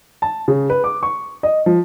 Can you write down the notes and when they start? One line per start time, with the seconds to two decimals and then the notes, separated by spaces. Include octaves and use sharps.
0.22 A5
0.48 C#3
0.70 B4
0.84 D6
1.03 C#6
1.43 D#5
1.66 F3